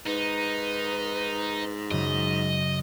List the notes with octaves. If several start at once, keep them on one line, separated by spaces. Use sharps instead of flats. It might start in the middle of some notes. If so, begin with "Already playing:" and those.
G#2 D#4 B4
F#2 C#3 D#5